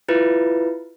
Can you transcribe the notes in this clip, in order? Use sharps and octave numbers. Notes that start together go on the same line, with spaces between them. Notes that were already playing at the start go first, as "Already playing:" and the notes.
E4 F4 B4